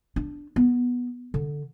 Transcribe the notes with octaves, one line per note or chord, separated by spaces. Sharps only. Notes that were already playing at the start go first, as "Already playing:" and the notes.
D4
B3
D3